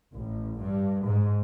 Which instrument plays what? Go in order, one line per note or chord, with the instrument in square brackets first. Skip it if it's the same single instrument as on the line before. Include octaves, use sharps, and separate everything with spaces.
[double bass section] A1
G2
G#2